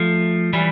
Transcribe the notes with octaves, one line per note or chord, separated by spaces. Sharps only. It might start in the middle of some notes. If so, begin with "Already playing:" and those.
Already playing: F3 A3
E3 G3